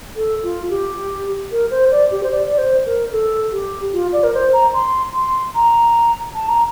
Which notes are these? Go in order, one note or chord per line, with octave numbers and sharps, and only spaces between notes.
A4
F4
G4
A#4
C5
D5
G4
C5
D5
D5
C5
A#4
A4
G4
F4
D5
A#4
C5
A#5
C6
C6
A#5
A5
A#5